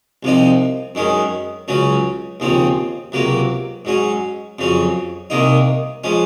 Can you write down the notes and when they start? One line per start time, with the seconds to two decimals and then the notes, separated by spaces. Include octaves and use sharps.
0.23 C2 C3 F3 C4 D#4
0.95 F#2 D#3 G#3 C#4
1.68 C#2 C#3 F#3 C#4
2.40 D#2 C#3 F3 C4
3.12 C#2 C3 F#3 A#3
3.85 G#2 F#3 C#4
4.59 F2 C#3 F#3 C#4
5.30 C2 C3 D#3 A#3 D#4
6.04 F3 G#3 C#4